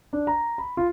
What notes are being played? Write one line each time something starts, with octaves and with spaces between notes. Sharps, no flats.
D4
A#5
B5
F4